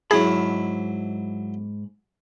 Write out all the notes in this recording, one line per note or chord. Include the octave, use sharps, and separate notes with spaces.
G#2 F#3 E4 G#4 E5 B5